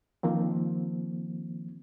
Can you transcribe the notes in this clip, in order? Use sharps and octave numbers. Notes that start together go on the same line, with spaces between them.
D#3 F3 A#3 C4